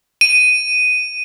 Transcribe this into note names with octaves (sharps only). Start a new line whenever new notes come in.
D#7